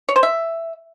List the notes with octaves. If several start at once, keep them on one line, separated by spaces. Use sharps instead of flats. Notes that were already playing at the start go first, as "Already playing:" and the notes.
C#5
C5
E5